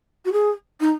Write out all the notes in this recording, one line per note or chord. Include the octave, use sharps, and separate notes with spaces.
F#4
G#4
D#4